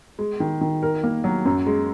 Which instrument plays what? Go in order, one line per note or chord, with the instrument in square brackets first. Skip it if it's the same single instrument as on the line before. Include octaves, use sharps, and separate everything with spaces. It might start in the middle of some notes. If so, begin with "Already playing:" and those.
[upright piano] G#3
D#3
D#3
A#4
A#3
F#3
F#2
G#3